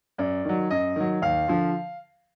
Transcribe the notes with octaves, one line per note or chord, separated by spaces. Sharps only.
F#2 D5
D#3 F#3
F#2 D#5
D#3 F#3
D#2 F5
D3 F3